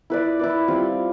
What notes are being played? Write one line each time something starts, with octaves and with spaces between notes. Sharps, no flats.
E4 B4 D5
E4 B4 D5
G3 C4 F4